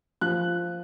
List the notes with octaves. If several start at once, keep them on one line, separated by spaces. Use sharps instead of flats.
F3 F#6